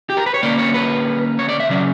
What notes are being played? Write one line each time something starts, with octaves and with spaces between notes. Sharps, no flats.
G4
A#4
B4
C#5
D3 A#3 C#4 D5
C#5
B4
C#5
D5
E5
C#3 F#3 C#4 D5